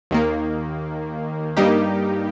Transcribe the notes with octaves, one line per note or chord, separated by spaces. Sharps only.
D#2 D#3 A#3
G2 G3 A#3 D#4 G4